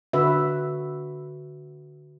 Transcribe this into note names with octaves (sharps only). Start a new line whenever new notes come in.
D3 F#4 B4 E5